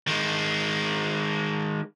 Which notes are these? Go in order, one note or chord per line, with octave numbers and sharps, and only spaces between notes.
D#3 G#3